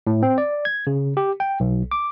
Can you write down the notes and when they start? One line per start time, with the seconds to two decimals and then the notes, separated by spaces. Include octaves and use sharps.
0.07 A2
0.23 C4
0.38 D5
0.65 G#6
0.87 C#3
1.17 G4
1.40 G5
1.60 B1
1.92 D6